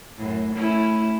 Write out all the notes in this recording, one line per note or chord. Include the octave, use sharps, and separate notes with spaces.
F#2 A2
A3 C#4 E4